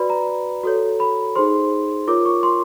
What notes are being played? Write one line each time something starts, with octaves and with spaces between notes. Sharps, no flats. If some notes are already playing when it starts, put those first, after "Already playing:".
Already playing: F#4 B4 D5 B5
A#5
F#4 A4 C#5
B5
D#4 G#4 C5 C6
F4 A#4 C#5 D6
C#6
C6